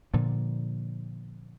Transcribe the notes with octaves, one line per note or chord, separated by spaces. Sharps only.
A#2 D3 F3